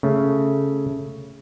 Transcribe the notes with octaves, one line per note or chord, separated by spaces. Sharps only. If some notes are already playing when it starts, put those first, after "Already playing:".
C#3 A3